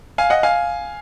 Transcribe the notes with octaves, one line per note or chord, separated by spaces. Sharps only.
F5 G#5
D#5 F#5
F5 G#5